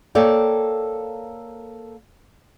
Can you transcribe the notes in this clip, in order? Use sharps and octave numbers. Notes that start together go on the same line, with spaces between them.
A#3 A4 C#5 D5 F5 G5